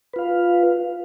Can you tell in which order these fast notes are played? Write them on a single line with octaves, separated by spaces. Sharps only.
B4 F4 F5